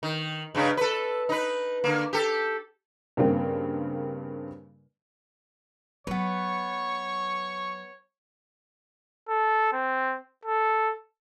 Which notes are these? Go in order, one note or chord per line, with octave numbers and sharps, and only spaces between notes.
D#3
G2 C#3 G#3
A4 B4
D#4 B4
D3 A#3
G4 A4
G2 C#3 A#3 C4
F#3 B3 B4 C#5 C#6
A4
C4
A4